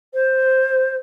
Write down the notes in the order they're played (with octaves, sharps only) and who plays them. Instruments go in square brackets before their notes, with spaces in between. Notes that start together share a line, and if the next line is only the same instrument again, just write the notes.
[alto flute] C5